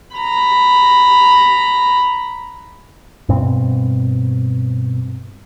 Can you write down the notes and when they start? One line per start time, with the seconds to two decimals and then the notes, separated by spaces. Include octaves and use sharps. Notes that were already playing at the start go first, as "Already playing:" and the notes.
0.16 A#5 B5
3.29 G2 B2 C4